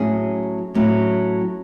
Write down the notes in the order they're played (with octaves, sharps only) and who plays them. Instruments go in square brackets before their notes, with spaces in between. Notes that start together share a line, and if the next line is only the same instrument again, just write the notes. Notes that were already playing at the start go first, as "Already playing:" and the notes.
Already playing: [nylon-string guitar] A2 F#3 C#4 E4 G#4
A2 F#3 C#4 E4